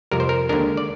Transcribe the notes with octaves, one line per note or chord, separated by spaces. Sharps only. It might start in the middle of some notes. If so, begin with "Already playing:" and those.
F2 C3 G3 A#4
C5
A#4
D#2 D3 G#3 D4 A#4
D5